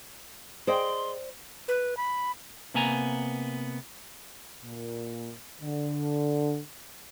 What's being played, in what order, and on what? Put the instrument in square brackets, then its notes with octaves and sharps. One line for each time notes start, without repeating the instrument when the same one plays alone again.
[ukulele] G#4 D#5 G5 [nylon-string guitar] C5 D5 [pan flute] C6
[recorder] B4
B5
[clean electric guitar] C3 A#3 B3 G#5 A#5
[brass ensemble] A#2
D3